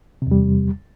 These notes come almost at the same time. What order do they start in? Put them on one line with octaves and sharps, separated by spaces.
C3 E2 G3